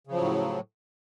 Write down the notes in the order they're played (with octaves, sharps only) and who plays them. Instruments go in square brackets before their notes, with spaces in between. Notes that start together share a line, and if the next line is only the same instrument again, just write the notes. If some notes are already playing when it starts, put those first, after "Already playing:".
[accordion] C#3
F3
F#3
A2